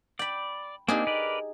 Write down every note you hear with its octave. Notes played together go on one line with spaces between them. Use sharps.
D5 G5 B5
A#3 C4 D4 D#4 G4 G#4
A#4 B4 D5